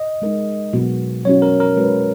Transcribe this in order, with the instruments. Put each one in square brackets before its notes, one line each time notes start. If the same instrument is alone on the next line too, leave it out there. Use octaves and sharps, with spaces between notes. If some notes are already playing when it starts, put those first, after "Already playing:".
Already playing: [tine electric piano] D#5
[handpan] G#3 D#4 A#4
B2 F#3 B3 F#4
[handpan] F#3 C#4 F#4 [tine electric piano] C#5
[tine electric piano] A#4
A#4
[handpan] G#3 C#4 F#4 B4